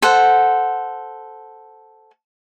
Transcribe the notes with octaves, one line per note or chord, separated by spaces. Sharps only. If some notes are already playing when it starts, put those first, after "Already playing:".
A4 C5 F#5